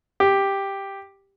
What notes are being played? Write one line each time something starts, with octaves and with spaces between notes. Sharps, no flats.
G4